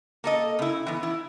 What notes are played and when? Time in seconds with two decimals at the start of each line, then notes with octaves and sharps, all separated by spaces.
0.24 A#3 A4 D#5
0.59 C#3 E4
0.87 E3 B3
1.03 E4